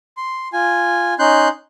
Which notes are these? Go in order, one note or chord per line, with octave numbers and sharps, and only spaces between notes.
C6
F4 G#5
C#4 D#4 C6 F#6 G6